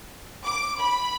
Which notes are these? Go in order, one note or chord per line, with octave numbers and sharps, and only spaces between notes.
D6
B5